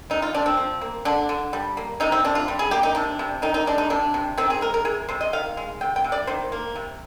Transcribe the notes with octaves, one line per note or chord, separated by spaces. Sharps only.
C3 D#4
F4
C3 D4
C4
F3
A#3
D3 D4
D3
G3
A#3
C3 D#4
C4
C3 D4
F4
G3
G#4
A#3 G4
D#4
C3 D4
C3
D#3 D#4
D#4
G#3 D4
D#4
C3 D4
C3
D#3 C4
G#4
G#3 A#4
A#4
C3 G#4
C3 C5
D#5
D#3 F5
G#3
C3 G5
G5
C3
D5
D#3 C5
A#3
C3